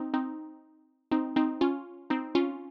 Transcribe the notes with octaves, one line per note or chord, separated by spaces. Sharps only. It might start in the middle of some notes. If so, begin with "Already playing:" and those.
Already playing: C4 D#4
C4 D#4
C4 D#4
C4 D#4
C#4 F4
C4 D#4
C#4 F4